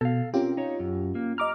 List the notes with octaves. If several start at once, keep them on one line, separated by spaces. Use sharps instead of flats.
B2 A4 F5
C4 C#4 F4 G4 A#4
D#4 C#5
F#2
A#3
D#5 A#5 D6 F6